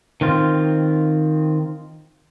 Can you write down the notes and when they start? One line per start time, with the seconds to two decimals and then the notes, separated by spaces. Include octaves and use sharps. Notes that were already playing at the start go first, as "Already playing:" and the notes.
0.21 D#3 C4 F4